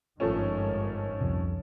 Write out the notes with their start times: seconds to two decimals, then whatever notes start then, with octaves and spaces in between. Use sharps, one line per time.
0.20 G#1 G2 D#3 F3 A3 C#4
1.20 C2 F2 C3